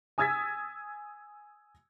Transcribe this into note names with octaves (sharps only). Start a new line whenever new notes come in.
G#5 D#6 E6 G#6 A6 B6